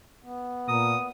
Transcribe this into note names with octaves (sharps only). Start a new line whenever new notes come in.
B3
A#2 A#4 D#6